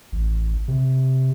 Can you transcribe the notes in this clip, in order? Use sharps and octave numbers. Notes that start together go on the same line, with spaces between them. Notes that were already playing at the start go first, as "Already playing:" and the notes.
A1
C3